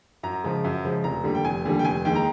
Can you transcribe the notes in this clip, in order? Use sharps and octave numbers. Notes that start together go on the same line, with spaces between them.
F#2 A#5
C#3 F3 G#3
F#2
C#3 F3 G#3
F1 A#5
D#2 D3 G3
G5
F1 G#5
D#2 D3 G3
G5
F1 G#5
D#2 D#3 G#3 G5
A#5